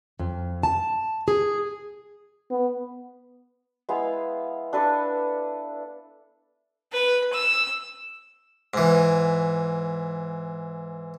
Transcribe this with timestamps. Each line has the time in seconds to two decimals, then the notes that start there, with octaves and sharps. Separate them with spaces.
0.19 F2
0.63 A5
1.28 G#4
2.51 B3
3.89 G#3 B3 E4 F5
4.73 D4 A4 B4 D5
6.92 B4
7.33 E6
8.74 G#2 E3